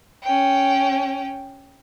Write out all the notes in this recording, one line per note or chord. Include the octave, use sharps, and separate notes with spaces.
C#4 G5